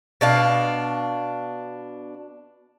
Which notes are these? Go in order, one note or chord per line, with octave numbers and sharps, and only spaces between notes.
B2 D4 F5